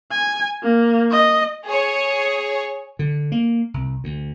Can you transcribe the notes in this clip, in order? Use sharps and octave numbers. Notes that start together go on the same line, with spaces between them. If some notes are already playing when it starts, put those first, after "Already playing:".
G#5
A#3
D#5
G#4 C#5
D3
A#3
C2
D2